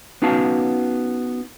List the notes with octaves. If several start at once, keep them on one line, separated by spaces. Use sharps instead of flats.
B3 C#4 D#4 F#4 F5 A5